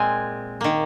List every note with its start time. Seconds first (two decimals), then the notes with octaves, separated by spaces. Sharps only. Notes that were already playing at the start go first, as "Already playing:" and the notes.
Already playing: A#2 G#3 C4 G#5
0.61 D#3 A#3